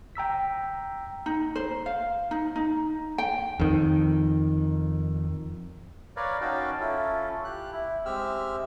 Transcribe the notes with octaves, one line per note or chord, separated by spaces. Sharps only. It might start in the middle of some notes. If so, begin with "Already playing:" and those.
G5 A#5 E6 B6
D#4
C5
F5
D#4
D#4
G5
F2 D#3
A#4 B4 C#5 D5 F5
C#4 D#4 F#4 F5 G5 A5
C#4 E4 F4 A4
G4 F#6
E4
G#3 C4 G4 E5 E6 F6